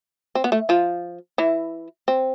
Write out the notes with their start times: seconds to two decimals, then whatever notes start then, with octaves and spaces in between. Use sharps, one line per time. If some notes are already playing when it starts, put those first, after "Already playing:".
0.35 C4
0.44 B3
0.52 A3
0.69 F3 F4
1.38 E3 E4
2.08 C4